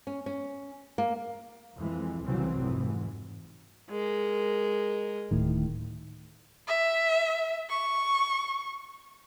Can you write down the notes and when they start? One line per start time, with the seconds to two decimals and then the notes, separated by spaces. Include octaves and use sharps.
0.07 C#4
0.26 C#4
0.98 A#3
1.77 F2 E3 G#3
2.25 C2 C#3 E3 F#3 G3 C4
2.57 F1 G#2 E3
3.90 G#3 A#4
5.31 D1 A2 D#3
6.67 E5
7.70 C#6